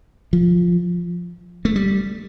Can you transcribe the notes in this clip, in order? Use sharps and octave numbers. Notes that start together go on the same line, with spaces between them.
F3
A3
G3